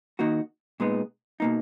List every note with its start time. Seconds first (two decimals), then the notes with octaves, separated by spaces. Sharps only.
0.19 D#3 A#3 D#4 F#4
0.80 A#2 G#3 B3 D#4
1.40 B2 A#3 D#4